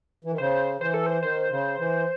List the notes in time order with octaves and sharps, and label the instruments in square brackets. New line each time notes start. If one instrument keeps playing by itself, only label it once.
[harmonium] E3
D#3
[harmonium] C#3 [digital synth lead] C5
[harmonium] E3 [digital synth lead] C5
[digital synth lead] A4
C5
[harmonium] D#3 [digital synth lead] C5
[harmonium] C#3
E3